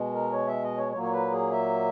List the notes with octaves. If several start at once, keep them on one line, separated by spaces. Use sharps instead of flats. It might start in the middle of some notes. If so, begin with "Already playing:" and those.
Already playing: B2 G#3
A#4
C#5
E5
D#5
C#5
A#2 F#3 A#3 C#5
C#5
B4
G#4
E5